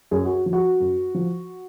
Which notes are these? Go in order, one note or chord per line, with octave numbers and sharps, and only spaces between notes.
F#2 G#4
F#4
F3
F#4
F#2
F3